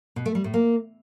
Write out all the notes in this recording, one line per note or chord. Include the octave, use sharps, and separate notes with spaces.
B2
A3
G3
A2
A#3